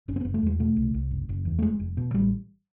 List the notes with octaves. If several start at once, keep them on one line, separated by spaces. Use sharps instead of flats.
F#1 C#4
C4
B3
F#1
A3
E2 G#3
B2 A3
C2
C2
F#1
F#1
E2
A3
F1 G#3
F1
B2
A1 G3